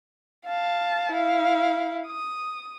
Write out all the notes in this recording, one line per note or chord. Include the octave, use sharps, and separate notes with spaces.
F5 A5
E4 F5
D#6